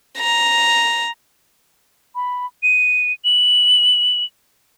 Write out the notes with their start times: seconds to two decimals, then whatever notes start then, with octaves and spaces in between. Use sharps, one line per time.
0.18 A#5
2.15 B5
2.63 D#7
3.25 F#7